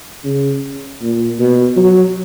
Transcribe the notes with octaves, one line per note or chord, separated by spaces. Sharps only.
C#3
A#2
B2
F#3